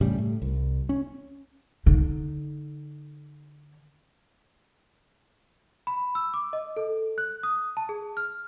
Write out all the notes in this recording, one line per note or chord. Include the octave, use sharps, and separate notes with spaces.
A2 C#3 G3
A2
C2
C#4
D3 D#4
B5
E6
D6
D#5
A4
F#6
D#6
A5
G#4
F6